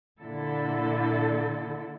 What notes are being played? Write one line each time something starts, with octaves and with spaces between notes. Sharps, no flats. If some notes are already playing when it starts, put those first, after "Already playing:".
A#2 D3 E4 A4